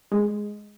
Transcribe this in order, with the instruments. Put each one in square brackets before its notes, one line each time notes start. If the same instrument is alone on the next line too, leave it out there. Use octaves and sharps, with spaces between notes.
[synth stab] G#3